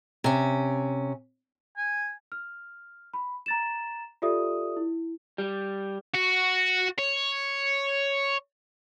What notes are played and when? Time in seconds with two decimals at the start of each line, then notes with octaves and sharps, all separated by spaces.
0.24 C3 C#4
1.77 G#5
2.32 F6
3.14 B5
3.46 A#5 A6 E7
4.22 F4 G4 A4 D5 E5 D#6
4.77 E4
5.38 G3
6.15 F#4
6.99 C#5